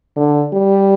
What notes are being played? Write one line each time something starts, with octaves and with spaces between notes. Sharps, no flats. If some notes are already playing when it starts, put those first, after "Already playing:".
D3
G3